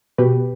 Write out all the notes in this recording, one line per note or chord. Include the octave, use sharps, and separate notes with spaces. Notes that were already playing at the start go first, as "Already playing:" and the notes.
B2 G4 B4